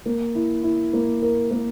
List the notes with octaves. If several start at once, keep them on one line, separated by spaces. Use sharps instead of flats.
A#3
E4
E4
A#3
A#4
A#3